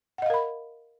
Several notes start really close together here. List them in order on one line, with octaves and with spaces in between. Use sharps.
F#5 D#5 F5 A#4 B5